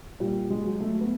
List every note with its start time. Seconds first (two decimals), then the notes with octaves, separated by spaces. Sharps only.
0.20 A#2 G3
0.50 G#3
0.65 F#3
0.80 A3
1.01 B3